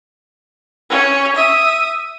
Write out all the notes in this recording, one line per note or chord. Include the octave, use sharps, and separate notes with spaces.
C#4
E5 D#6